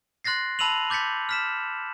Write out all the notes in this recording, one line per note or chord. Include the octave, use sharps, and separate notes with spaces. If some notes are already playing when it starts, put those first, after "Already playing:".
C6 F#6 A6 A#6 C7
A5 B5 E6 D#7 F7 F#7
D6 G6 A6 B6 C#7
F6 B6 E7